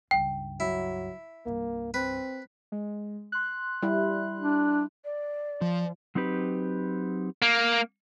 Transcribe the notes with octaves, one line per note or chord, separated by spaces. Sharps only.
C#2 G2 G5
F#3 E4
C2 G2 A#3
C4 B4
G#3
C6 F#6
G3 E4
D4
D5
F3
F#3 C4 D#4 G4 B4
A#3